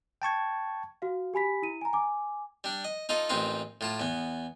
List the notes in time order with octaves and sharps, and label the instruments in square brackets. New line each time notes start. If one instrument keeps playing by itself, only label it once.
[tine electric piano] G5 A5 C#6 G#6
[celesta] F#4 F5
G4 G#5 B5 B6
E4 D#7
G#5 A#5
G#5 D6
[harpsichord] G3 D4
D#5
D#4 F4 A4 D#5
A1 A#3 C4 D#4 F4 B4
A2 F4 A5
E2 B3